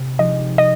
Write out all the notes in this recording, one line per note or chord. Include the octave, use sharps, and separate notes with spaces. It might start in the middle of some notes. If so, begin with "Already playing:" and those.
Already playing: C3 C4
F3 G#3 D#4 G4 D#5
D#5